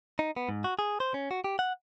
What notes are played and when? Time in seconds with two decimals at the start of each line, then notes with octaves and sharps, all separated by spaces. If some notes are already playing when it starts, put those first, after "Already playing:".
0.19 D#4
0.37 B3
0.49 G#2
0.64 F#4
0.79 G#4
1.00 C5
1.14 C#4
1.31 F#4
1.44 G4
1.59 F#5